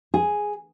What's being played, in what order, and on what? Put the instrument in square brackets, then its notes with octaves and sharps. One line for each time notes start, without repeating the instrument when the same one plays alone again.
[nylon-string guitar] G#4